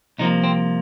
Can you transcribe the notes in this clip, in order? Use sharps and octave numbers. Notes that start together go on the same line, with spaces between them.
C2 C3 F3 A#3 D#4
C4